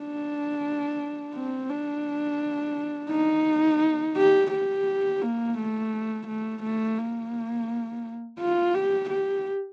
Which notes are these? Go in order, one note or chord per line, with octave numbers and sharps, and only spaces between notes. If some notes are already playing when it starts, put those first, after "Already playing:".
Already playing: D4
C4
D4
D#4
G4
G4
A#3
A3
A3
A3
A#3
F4
G4
G4